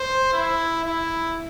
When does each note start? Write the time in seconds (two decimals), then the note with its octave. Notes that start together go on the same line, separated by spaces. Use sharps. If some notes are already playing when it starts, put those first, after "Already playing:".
Already playing: C5
0.33 E4
0.85 E4